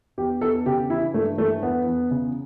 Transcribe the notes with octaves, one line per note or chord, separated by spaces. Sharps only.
E2 G4
E2 A4
C#3 G4
E3 E4
G2 A3
E3 A3
E2 B3
E2
C#3